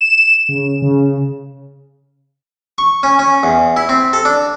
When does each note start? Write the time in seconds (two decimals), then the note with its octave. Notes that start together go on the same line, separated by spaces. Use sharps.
0.01 E7
0.49 C#3
0.82 C#3
2.78 C#6
3.03 C#4
3.19 C#4
3.43 E2
3.77 E4
3.89 C4
4.13 A4
4.25 D4